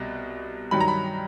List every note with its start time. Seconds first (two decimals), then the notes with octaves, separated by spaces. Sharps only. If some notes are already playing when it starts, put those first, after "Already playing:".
Already playing: C2 B2
0.71 G2 D#3 F#3 B5
0.80 A#5
0.88 B5